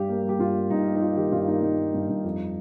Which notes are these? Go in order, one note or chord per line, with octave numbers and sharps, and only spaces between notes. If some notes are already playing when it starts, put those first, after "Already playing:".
Already playing: G2 G3 G4
A#3
G3 G4
G2 F4
A#3
G2 D#4
A#3
D#4
A#3 F4
D#3 G4
G2 F4
A#3 D#4
G2 D#4
A#3
G2
G2
F2